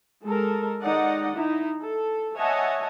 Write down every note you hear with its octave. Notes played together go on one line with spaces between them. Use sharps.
G#3 A4 A#4
D#3 G#3 D#4 D5 D#5 F#5
D#4 E4
A4
C#5 D#5 E5 F#5 G#5 A5